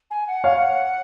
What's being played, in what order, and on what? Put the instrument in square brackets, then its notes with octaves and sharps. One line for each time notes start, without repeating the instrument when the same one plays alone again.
[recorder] G#5
F#5
[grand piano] C#5 F5